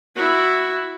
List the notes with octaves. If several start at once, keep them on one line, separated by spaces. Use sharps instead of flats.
E4 F#4